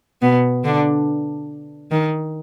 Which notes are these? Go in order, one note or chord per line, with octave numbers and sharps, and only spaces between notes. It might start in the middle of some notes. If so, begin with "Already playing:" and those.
B2 B3
D3 D4
D#3